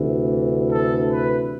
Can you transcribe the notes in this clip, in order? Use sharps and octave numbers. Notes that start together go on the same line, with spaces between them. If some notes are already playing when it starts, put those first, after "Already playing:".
Already playing: D2 C3 E3
A4
B4